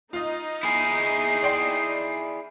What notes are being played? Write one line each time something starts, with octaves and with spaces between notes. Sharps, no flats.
D#4 F4 D#5
E4 G#4 C7
D5 G5 C6